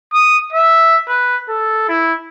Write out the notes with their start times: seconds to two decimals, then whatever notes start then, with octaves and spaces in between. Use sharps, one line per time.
0.13 D#6
0.53 E5
1.08 B4
1.49 A4
1.89 E4